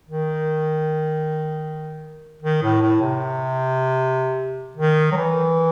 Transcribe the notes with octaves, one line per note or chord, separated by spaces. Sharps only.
D#3
D#3
A2
A2
C3
D#3
F#3
E3